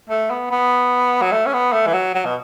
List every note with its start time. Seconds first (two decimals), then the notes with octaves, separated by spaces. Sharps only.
0.09 A3
0.30 B3
0.51 B3
1.22 F#3
1.32 A3
1.46 C#4
1.53 B3
1.73 A3
1.87 E3
1.93 F#3
2.15 F#3
2.25 B2